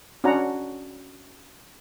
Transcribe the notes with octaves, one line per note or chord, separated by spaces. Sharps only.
C#4 D4 F#4 C#5 F#5 A#5